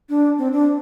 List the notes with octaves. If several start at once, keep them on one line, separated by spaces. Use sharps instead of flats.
D4
C4
D4